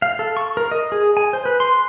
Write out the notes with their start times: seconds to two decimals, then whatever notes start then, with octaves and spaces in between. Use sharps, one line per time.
0.02 F5
0.19 A4
0.37 C#6
0.57 A#4
0.71 D#5
0.92 G#4
1.17 G#5
1.33 C5
1.45 B4
1.60 C6